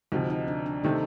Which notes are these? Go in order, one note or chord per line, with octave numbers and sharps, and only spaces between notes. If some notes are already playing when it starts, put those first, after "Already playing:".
D2 C3 F3 D#4
D#4
D4
D4
C3 D#3 A3 C4 D#4